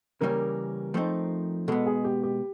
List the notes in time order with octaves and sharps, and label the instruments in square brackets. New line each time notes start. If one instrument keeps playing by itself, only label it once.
[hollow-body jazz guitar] C#3 E3 G3 A#3 C#4 [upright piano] A#4
[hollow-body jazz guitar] F3 A3 C4 D#4
[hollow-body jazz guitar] B2 G#3 B3 [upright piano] A4
[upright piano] G#4
G4
G4